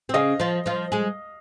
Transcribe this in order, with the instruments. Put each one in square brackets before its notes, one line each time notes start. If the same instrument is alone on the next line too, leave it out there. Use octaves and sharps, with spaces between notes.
[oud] C4
[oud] C#3 C#4 [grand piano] D#5 F5
[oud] F3 F4
F3 F4
G#3 G#4